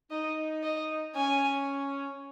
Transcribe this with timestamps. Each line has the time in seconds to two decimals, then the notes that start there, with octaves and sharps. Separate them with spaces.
0.11 D#4 D#5
0.64 D#5
1.15 C#4 G#5